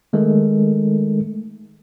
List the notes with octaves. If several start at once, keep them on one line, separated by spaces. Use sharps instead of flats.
D#3 G#3 A3 D#4 A4 A#4